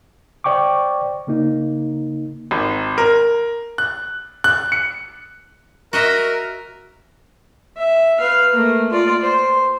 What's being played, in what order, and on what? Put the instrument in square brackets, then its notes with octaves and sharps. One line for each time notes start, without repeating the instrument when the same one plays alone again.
[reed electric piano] C5 D5 G5 C#6 D6
C#3 A#3 D#4
[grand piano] G#1
A#4
F#6
F#6
C#7
[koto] F#4 D#5 E5 [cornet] A#4
[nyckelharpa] E5
B4 F5
A3 A#3
F4 D5
C5